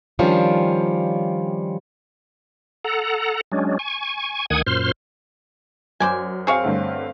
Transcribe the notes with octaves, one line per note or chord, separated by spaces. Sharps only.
D#3 F3 G3 C#4 D4 F4
A4 F#5 A#5
F#3 G#3 C#4 D4
G#5 C#6
D2 D#3 F#5 G#5 D#6 G#6
F#2 A#2 C5 C6 F6
F#2 C5 D5 G#5
C4 G#4 C#5 F5
G2 D3 A3